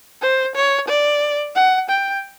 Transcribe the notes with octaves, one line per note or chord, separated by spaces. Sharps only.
C5
C#5
D5
F#5
G5